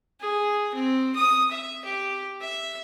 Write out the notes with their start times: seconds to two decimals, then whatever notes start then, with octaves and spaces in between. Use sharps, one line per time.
0.20 G#4
0.74 C4
1.15 D#6
1.51 E5
1.84 G4
2.41 E5